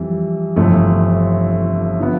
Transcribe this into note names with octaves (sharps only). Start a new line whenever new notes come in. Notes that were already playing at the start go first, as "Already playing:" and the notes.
Already playing: F2 E3 G3
G1 F2 C3 E3 A3
D3 F3 B3